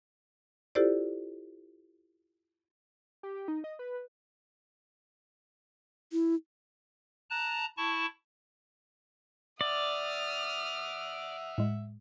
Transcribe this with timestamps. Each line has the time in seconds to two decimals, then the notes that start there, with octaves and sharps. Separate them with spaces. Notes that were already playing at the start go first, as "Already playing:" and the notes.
0.75 E4 F4 G4 A4 C5 D5
3.23 G4
3.48 D#4
3.64 D#5
3.79 B4
6.12 E4
7.30 A5 A#5 F#6
7.77 E4 A5 C#6
9.61 D5 E5 F#5 D#6 F6
11.58 A2 G#3